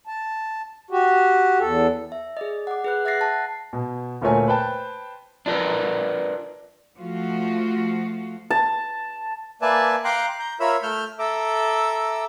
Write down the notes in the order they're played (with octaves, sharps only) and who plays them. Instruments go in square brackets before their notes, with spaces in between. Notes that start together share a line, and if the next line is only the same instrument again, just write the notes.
[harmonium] A5
F#4 G4
E2 A4
[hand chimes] E5
G#4 D5 D#5
F#5 D6
G#4 B4 F#6
E5 F#5 F#6 A6 A#6 C7
A5
[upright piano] B2
D2 A#2 A3 A#4 C#5 G#5
B4 C5 G5 A5
[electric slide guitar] D4 F4 A#4 B4
[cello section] F3 A3 F4 F#4
[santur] A5
[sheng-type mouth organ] A#3 B4 D5 E5 G#5 A5
F5 G5 A#5 C6 D6 F#6
A#5 G6
F4 A#4 C#5 E5 B5 E6
A3 E6 F6 G6
A4 E5 A#5 D6 E6